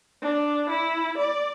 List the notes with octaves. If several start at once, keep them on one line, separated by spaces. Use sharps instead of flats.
D4
E4
D5